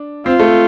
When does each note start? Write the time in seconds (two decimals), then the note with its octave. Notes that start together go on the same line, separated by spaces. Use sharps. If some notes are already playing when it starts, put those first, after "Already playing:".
Already playing: D4
0.26 C4 F4
0.40 A3